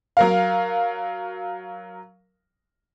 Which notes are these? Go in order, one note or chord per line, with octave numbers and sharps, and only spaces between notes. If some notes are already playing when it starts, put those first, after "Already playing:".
F#3 A#4 F5